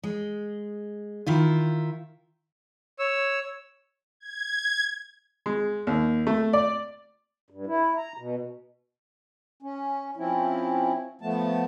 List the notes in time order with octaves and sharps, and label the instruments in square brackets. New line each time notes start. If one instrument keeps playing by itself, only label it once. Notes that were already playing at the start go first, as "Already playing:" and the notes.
[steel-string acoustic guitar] G#3
D#3 E4 F4
[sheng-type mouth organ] C#5 E6
[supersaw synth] G#6
[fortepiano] G#3
D#2
A3
D5
[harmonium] G2
E4
A#5
B2
C#4
F3 C4 C#4 E4
F3 A3 B3 A5